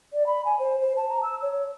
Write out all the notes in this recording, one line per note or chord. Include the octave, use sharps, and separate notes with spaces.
D5
B5
G#5
C5
C5
A5
A#5
E6
C#5